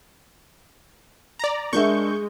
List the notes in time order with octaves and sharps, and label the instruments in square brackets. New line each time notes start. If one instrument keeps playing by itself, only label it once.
[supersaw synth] D5 A#5
[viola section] G#3 [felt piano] D4 A#4 E5 [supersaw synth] C#6 G6